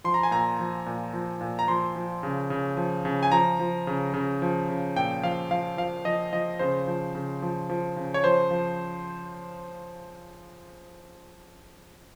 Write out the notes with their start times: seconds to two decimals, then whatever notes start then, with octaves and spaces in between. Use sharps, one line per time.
0.04 F3 C6
0.14 A#5
0.23 G#5
0.31 A#2 A#5
0.59 F3
0.86 A#2
1.14 F3
1.41 A#2
1.59 A#5
1.68 F3 C6
1.96 F3
2.23 C#3
2.50 C#3
2.77 F3
3.05 C#3
3.23 G#5
3.32 F3 A#5
3.59 F3
3.87 C#3
4.14 C#3
4.42 F3
4.69 C#3
4.96 A#2 G5
5.23 F3 F5
5.51 F3 F5
5.77 F3 F5
6.05 F3 D#5
6.33 F3 D#5
6.59 C#3 C5
6.87 F3
7.15 C#3
7.42 F3
7.70 F3
7.96 C#3
8.14 C#5
8.24 F3 C5
8.51 F3